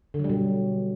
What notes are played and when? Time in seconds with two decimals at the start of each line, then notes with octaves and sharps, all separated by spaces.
0.14 D3
0.19 F#3
0.24 G3
0.29 B2